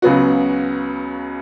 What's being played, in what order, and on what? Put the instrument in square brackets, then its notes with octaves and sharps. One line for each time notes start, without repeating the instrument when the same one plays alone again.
[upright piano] C#2 C#3 F#3 B3 F#4